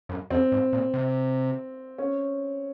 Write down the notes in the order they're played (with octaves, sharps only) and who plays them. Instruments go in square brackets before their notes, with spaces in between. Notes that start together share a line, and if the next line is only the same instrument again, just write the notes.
[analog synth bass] F#2
[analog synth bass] F2 [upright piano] C4
[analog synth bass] G#2
A#2
C3
[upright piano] C#4